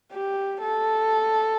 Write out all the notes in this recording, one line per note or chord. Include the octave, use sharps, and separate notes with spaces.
G4
A4